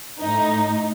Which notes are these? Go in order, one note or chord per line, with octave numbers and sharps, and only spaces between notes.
A2 D#4